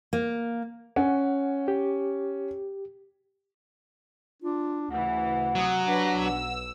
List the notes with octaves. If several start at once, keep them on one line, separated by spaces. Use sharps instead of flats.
A#3
C#4 F#5
G4
D4 F4
D2 C#3 E3 F#5
C3 F#3 D#6
D4 G4 B4 A#6
B1 E6